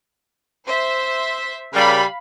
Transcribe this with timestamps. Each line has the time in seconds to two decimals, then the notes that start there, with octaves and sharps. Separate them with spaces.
0.66 C5 E5
1.74 C#3 G3 A#4 F5 B5